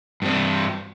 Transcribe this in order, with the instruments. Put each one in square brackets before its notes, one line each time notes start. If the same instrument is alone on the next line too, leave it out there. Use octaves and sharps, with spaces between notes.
[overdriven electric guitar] G2 C4